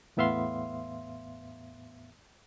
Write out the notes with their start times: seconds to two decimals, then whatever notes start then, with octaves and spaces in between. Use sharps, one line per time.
0.17 E2 A2 B3 E5 F5 C6